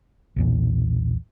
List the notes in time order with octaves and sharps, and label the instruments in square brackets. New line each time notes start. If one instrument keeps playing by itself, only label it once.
[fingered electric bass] B1 E2 A#2